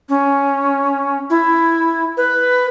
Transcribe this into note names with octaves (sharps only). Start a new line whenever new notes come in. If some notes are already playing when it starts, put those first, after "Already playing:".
C#4
E4
B4